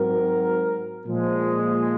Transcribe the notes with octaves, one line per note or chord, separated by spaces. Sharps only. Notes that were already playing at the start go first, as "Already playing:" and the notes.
Already playing: G#2 F#3 C4 F#4 A#4
A#2 F3 G#3